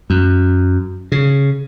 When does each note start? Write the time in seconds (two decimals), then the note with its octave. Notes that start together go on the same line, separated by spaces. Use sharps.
0.10 F#2
1.12 C#3